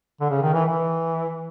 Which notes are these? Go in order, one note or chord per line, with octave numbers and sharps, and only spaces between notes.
D3
C#3
D#3
E3
E3